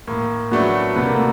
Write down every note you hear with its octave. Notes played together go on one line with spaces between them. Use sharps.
A2 A#3
F#3 A3 B3 D4
C3 B3
A#3
A3